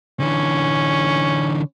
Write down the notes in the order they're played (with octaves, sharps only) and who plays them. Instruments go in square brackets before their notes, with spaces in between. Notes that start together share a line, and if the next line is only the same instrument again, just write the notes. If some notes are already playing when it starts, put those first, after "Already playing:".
[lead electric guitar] D3 E3 [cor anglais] C#4